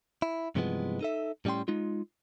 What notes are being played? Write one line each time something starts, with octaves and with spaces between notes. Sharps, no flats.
E4
G2 C3 E3 F3 G#3 B3
D#4 A4 E5
A2 G3 C#4 G5 C6
G#3 D#4 F4